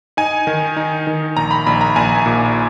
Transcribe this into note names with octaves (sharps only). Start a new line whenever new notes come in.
D#4 G#5
D#3
D#4
D#3
A#1 A#5
B5
A#1 B5
A#5
A#1 G#5
A#2